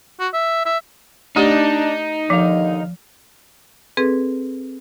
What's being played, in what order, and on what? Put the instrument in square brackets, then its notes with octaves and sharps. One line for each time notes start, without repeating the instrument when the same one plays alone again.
[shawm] F#4
E5
E5
[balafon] A3 G4 [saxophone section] D4 [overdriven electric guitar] D#4
[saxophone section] D#2 D3 F5 [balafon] F3
[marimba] C4 G#4 A4 B4